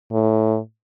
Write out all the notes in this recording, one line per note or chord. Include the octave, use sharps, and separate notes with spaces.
A2